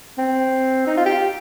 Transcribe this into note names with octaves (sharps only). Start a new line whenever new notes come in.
C4
D#4
F4
G4